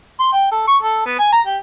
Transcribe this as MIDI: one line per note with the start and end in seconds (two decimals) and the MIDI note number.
0.20 0.30 84
0.33 0.48 79
0.51 0.66 69
0.67 0.77 85
0.83 1.04 69
1.06 1.17 59
1.19 1.30 80
1.32 1.41 82
1.46 1.57 67